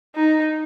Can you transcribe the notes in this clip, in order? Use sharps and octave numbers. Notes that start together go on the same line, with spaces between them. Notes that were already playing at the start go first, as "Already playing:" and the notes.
D#4